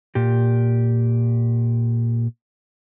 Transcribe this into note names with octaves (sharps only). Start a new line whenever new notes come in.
A#2 G4